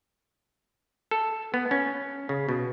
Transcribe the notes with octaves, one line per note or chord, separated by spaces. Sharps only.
A4
B3
C#4
C#3
B2